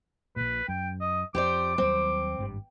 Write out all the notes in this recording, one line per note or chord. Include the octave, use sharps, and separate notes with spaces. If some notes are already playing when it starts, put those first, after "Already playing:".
A#1 A#2 B4
F#2 G5
D#5
F2 G4 C5 D5 D6
D#2 F#3 G3 C4
G#1 G2 G3